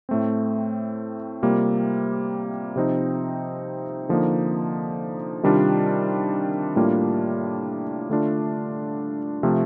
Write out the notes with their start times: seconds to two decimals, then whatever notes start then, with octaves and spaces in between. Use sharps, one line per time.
0.09 A2 A3 C4
1.42 C3 G3 A#3 F4
2.76 C3 F3 C4 D#4
4.09 D3 F3 A#3 D#4
5.43 C3 D#3 G3 D4 F4
6.76 A2 G3 A#3 D4 F4
8.10 D3 A3 D4 F4
9.43 C3 F3 A3